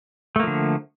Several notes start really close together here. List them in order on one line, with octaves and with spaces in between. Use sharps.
A3 A#3 F3 D3